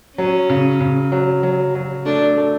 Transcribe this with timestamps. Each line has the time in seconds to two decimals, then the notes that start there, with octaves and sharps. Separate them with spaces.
0.18 F#3 C#4
0.49 C#3
0.80 C#3
1.12 F#3
1.43 F#3
1.75 F#3
2.05 A3 D4
2.37 A3